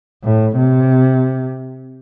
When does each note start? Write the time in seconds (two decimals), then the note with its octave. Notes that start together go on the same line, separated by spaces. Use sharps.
0.24 A2
0.56 C3